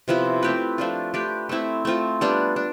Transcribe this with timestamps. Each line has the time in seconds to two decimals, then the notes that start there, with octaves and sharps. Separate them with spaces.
0.08 C3 F3 B3 E4
0.43 A3 C4 G4 B4
0.78 F3 A3 D4 F4
1.14 A3 D4 G4 B4
1.49 A3 C4 E4
1.85 A3 C4 F4
2.21 G3 B3 D4
2.56 D4